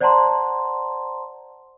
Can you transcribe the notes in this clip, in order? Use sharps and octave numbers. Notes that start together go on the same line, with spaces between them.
C5 D5 F#5 A5 A#5 C6